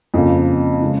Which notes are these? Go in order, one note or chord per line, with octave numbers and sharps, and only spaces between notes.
F2 C#3 F3 A#3
C#3 G#3